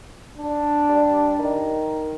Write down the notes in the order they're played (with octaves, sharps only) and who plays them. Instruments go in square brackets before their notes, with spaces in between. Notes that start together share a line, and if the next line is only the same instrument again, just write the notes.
[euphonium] D4
[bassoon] G3
D#3